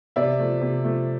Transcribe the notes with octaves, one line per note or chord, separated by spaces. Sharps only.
C3 D5 E5
F3 A3
C3
F3 A3